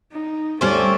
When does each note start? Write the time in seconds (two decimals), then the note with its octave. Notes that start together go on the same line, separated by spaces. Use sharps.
0.12 D#4
0.61 D2 G3 A3 C4 C#4 F#4 D5